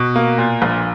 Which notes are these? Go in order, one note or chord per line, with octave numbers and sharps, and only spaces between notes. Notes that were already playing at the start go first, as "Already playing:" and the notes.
Already playing: B2
A#3
A#2
A#1